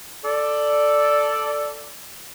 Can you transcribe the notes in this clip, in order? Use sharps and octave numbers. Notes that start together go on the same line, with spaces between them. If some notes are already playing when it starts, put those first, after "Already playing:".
A4 D5